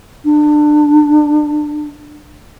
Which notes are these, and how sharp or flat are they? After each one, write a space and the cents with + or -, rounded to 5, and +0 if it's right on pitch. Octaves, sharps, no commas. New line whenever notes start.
D4 +25